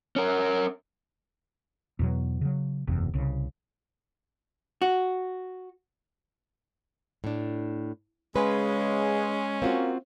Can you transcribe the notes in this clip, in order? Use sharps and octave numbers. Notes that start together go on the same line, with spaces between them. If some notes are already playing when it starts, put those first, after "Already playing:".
C#4 A#4
E2 B2 F#3
C#3 F#3
F#1 E2 C3
C2 C#3
F#4
A2 D4
C#3 G#3 C#4 B4
A#3 C4 F4 F#4